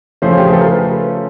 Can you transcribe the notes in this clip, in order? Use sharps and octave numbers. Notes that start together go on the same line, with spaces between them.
C#3 F3 A3 C#4 C5
G4
G#4
A4
A#4
B4